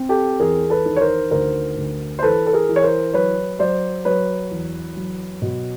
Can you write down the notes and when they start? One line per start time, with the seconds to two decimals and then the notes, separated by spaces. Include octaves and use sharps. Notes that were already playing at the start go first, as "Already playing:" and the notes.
Already playing: C4
0.09 G4 A4
0.40 E2 G#4 A#4
0.70 A4 B4
0.86 D#3
0.96 C#5
1.01 A#4 C5
1.31 D2 A#4 C5
1.77 D2
2.19 C5
2.23 E3 A4 B4
2.47 A4
2.53 G#4 A#4
2.69 E3
2.76 C#5
2.83 A#4 C5
3.14 F#3 B4 C#5
3.59 F#3 C5 D5
4.05 F#3 B4 C#5
4.51 E2
4.97 F#3
5.42 B2